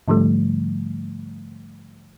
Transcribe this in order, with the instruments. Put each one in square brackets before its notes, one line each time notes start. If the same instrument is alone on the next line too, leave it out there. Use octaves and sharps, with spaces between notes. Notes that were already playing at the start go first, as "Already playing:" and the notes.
[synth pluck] G#2 D3 F3 G3 A3